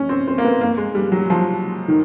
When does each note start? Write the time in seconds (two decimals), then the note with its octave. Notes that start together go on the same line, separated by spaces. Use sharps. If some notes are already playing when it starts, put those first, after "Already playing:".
Already playing: C#4
0.09 C4
0.28 C4
0.38 A#3
0.45 B3
0.61 A#3
0.78 G#3
0.95 G3
1.12 F#3
1.30 F3
1.88 D#3